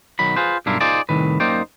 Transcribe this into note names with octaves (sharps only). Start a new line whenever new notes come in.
B1 D#3 F#3 B5
F4 G#4 B4 C5
B1 G2 D4 E4 F4 A#4
D#4 F4 G#4 C5 D5
C2 A2 D#3 B4
F#2 A#3 D#4 C5 D5 G5